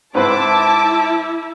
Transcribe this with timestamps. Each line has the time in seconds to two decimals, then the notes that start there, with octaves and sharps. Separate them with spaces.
0.15 G#2 C4 E4 B4 E5 A5 D6